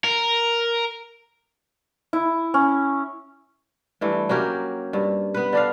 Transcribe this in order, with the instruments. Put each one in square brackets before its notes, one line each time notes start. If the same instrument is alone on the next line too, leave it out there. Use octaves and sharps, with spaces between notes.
[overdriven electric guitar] A#4
[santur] E4
C#4
[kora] G2 E3 A3
F#3 A#3 C#4 G4
G2
B3 B4
D3 D4 F5